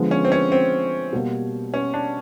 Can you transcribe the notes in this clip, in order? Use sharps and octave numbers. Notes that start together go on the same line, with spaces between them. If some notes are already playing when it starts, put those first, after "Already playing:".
Already playing: D3 F3 G#3 B3
C#4
C4
C#4
C4
B2 G3 A#3
C#4
D4